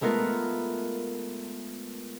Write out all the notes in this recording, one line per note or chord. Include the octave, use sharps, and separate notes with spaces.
G#3 A3 B3 F4 A#4